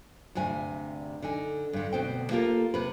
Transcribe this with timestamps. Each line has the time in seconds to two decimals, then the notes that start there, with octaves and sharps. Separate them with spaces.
0.35 D2 G2 C3 G#5
1.22 D3 D#4 G#5
1.73 G2 D3
1.92 D2 B2 C4 G5
2.31 A#3 F4 G4 A4 A#4
2.74 C3 B4